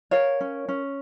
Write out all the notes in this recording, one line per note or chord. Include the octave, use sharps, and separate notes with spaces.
A#4 C#5 F5
C#4
C#4